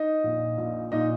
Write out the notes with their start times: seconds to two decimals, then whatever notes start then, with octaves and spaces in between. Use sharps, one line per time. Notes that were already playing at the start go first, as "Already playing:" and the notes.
Already playing: D#4 D#5
0.23 A#1 A#2
0.58 A#1 A#2
0.91 A#1 A#2 D#4 D#5